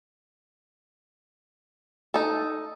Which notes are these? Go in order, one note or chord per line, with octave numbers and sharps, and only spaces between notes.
D#4 A4